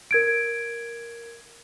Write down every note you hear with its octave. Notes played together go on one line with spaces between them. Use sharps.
A#4 G#6 D7